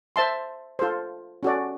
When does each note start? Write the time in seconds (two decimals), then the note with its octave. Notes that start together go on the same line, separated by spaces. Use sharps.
0.16 C5 E5 A5 C6
0.79 F4 A4 C5
1.43 C#4 F#4 A4 D5